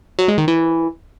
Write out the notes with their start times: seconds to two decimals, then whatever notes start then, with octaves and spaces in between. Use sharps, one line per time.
0.19 F#3
0.28 G#3
0.38 D#3
0.48 E3